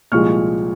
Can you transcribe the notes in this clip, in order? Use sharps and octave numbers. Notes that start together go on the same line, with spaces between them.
C2 A#2 F3 G#3 C#6 F6